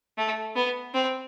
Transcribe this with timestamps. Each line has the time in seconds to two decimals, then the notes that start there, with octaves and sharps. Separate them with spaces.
0.18 A3
0.56 B3
0.94 C4